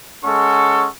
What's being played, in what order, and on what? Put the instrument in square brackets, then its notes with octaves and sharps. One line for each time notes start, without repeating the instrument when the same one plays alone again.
[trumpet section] G#3 C#4 A4 F#5 C#6